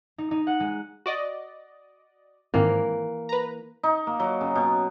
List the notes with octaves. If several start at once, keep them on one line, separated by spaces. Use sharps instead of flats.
D#4
D#4
F#5
G#3
F#4 D5 D#5
G#2 D#3 E3 A#3 C4
B4 A#5
D#4
A#3
F#3
C#3
B2